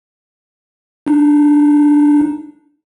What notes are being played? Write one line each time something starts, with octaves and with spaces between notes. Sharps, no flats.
D4 D#4